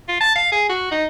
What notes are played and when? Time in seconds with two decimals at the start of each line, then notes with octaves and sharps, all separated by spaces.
0.08 F4
0.20 A5
0.35 F5
0.52 G#4
0.69 F#4
0.91 D#4